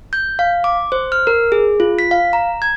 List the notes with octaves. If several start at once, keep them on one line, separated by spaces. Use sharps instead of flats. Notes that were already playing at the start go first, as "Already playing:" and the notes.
G6
F5
D6
C5
F6
A#4
G#4
F4
B6
F5
A#5
G#6